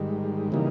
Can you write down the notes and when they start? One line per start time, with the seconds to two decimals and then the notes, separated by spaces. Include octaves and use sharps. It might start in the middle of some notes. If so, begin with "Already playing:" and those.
Already playing: G#2 D#3 G3
0.52 C#3 E3 G3 A#3 D#4